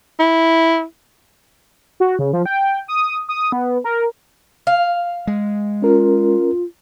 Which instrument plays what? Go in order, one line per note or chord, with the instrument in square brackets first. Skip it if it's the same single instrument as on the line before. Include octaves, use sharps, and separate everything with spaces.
[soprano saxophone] E4
[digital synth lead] F#4
C#3
F3
G5
D#6
D#6
B3
A#4
[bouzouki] F5
[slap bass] G#3
[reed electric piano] C#4 A#4 [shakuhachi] F4